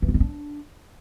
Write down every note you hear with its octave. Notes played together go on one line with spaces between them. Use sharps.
E3
F4
D#4
D4